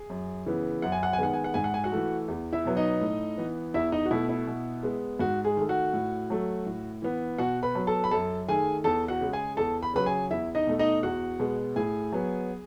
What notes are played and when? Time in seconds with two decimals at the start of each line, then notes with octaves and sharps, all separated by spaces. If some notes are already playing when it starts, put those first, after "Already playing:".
Already playing: G#4
0.10 F#2
0.46 C#3 E3 B3
0.82 F#2 F#5
0.92 G#5
1.03 F#5
1.13 G#5
1.18 D#3 G#3 B3 F#5
1.33 G#5
1.44 F#5
1.54 G#2 G#5
1.64 F#5
1.74 G#5
1.84 F#4 F#5
1.92 E3 A3
2.28 E2
2.53 E4 E5
2.65 B2 F#3 B3
2.77 D#4 D#5
3.01 A2
3.38 E3 B3
3.74 E2 E4 E5
3.92 D#4 D#5
4.05 F#4
4.11 B2 A3 E4
4.29 E4
4.47 B2
4.83 G#3 B3
5.19 G#2 F#4
5.44 G#3 G#4
5.57 D#3 A3
5.69 F#4 F#5
5.93 A2
6.30 F#3 A3
6.66 A2
7.02 E3 B3
7.38 B2 F#4 F#5
7.63 B4 B5
7.75 F#3 B3
7.87 A4 A5
8.04 B5
8.11 F#2 A4 A5
8.48 D#3 A3 G#4 G#5
8.84 E2 A4 A5
9.08 F#4 F#5
9.21 C#3 G#3
9.33 G#4 G#5
9.57 E2 A4 A5
9.83 B5
9.94 C#3 F#3 B4 B5
10.06 G#4 G#5
10.31 E2 E4 E5
10.55 D#4 D#5
10.67 B2 A3
10.79 D#4 D#5
11.03 E2 F#4 F#5
11.40 B2 G#3 B3
11.76 A2 G#4 G#5
12.12 F#3 B3